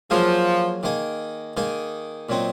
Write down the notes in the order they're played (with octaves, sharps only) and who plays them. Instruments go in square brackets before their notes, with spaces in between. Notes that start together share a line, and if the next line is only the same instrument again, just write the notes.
[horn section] F3 [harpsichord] F#3 A#3 F4 G#4
[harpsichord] D#3 A#3 D#4 G#4
D#3 A#3 D#4 G#4
A#2 F#3 C4 D#4